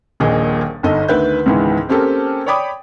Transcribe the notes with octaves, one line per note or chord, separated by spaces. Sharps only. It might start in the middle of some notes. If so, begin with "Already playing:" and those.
D#1 A#1 A#2 G#4 D#5
G1 D#4 A4 D#5
D2 D#3 B4 E5 G6
C#2 G#2 D#3 E3 B3
A#3 C4 C#4 G4 A4 A#4
C#5 D5 G5 B5 D6 D#6